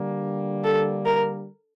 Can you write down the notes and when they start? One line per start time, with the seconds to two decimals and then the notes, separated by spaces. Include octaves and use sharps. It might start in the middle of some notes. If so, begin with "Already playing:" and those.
Already playing: D3 G3 A#3
0.64 A4
1.05 A#4